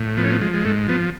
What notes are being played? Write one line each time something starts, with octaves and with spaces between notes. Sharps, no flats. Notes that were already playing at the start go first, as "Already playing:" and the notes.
Already playing: A2
F3 B3
C#4
B3
F3 G#3
G#3
G#2 A3
F3 B3